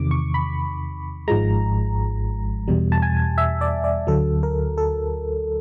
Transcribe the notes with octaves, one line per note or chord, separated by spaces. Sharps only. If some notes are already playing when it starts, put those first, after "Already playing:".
Already playing: E2 C3 D#3 D6
C#6
B5
G#1 G#2 F3 G#3 A#5
E2 B2 G3
A5
G#5
E5
D5
D5
D2 D3 F#3 A4
A#4
A4